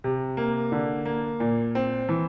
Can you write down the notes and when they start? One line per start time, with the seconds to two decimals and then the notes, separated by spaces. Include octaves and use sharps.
0.04 C3
0.37 A#3
0.72 D3
1.06 A#3
1.40 A#2
1.75 C4
2.09 E3